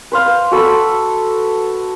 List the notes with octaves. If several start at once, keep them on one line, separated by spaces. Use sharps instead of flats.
B4 C5 F5
F#4 A4 B5